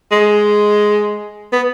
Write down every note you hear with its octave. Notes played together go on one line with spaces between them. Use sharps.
G#3
B3